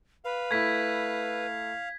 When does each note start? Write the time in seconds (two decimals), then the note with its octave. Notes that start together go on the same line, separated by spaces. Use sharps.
0.25 B4 F5
0.51 A3 E4 G#6 B6